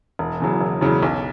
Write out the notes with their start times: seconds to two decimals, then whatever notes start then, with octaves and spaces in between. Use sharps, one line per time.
0.19 E1
0.40 E2 C#3 F#3
0.61 E1
0.81 E2 C#3 F#3
1.03 B1